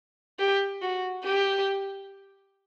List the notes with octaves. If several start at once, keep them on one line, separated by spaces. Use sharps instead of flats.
G4
F#4
G4